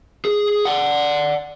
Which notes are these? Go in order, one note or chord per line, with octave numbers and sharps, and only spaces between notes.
G#4
D5 F#5